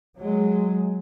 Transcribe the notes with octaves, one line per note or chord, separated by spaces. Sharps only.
F#3 G#3